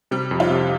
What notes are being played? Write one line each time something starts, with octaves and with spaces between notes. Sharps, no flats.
C3 G3
F2
F4
C3